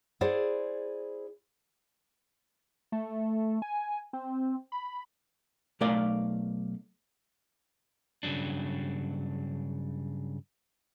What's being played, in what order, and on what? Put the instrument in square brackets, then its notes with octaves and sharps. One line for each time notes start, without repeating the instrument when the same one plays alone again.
[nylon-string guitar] E4 G#4 C5 D5 F#5
[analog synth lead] A3
G#5
C4
B5
[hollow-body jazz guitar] B1 A3 A#4 D5 F5
[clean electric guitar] G2 C#3 F3 F#3 D4